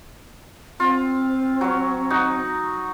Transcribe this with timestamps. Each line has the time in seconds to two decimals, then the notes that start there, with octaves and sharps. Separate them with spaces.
0.80 C4 F4
1.61 F#3 C#5
2.10 D#4 F#4